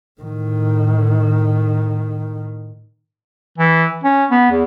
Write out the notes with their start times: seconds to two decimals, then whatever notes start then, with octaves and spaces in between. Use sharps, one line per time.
0.21 A2 D#3
3.58 E3
4.04 C#4
4.31 B3
4.51 E2